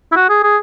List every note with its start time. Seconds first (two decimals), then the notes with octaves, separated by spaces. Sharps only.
0.12 E4
0.16 F#4
0.30 G#4
0.43 G#4